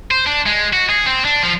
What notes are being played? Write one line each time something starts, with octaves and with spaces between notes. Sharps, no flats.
C5
D4
G#3
F#4
G#4
C4
D4
F3